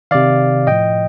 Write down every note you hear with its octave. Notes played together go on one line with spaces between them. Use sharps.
C3 D#3 D5 F5
A2 F3 D#5 G5